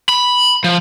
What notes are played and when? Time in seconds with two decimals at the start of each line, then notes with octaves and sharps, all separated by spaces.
0.09 B5
0.64 F3